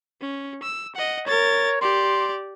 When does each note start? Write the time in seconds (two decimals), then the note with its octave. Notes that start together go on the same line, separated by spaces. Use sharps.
0.21 C#4
0.63 E6
0.95 D#5 F#5
1.27 A#4 C#5 A6
1.81 G4 D5 C6